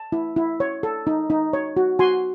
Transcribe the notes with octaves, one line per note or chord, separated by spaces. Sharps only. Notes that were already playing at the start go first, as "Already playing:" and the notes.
Already playing: A5
E4
E4
C#5
A4
D#4
D#4
C#5
F#4
F#4 G#5 C6